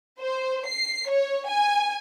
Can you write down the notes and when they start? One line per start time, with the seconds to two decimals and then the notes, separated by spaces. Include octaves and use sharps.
0.20 C5
0.66 C7
1.08 C#5
1.48 G#5